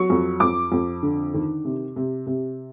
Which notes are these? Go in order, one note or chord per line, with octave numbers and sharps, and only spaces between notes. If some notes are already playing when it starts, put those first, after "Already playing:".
Already playing: F#3 C#6
F2
F2 D6
F2
D3
D#3
C3
C3
C3